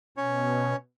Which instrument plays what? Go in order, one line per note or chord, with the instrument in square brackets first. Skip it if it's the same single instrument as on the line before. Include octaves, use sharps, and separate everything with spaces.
[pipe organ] B2 [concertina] C#4 C#5